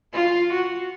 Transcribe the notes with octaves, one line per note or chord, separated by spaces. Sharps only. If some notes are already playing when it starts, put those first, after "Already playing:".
F4
F#4